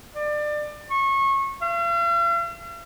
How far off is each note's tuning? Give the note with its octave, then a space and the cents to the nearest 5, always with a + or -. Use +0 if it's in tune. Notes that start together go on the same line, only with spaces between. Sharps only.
D5 +25
C#6 -25
F5 -45